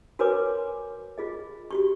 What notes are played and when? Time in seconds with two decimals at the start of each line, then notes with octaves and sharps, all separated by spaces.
0.19 F#4 A#4 B4 C#5 G#5 D6
1.18 F4 G#4 D#5
1.71 F#4 G4 C#6